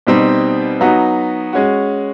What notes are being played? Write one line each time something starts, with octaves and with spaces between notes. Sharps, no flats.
B2 G3 C4 D#4
F#3 B3 D#4 F#4
G#3 C#4 F#4